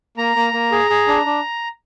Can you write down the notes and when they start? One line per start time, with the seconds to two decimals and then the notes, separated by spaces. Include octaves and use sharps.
0.17 A#3 A#5
0.36 A#3
0.53 A#3
0.72 G#4
0.90 G#4
1.08 D4
1.26 D4